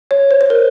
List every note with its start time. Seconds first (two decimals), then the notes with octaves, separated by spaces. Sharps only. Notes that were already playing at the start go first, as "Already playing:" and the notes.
0.11 C#5
0.31 C5
0.41 C5
0.50 A#4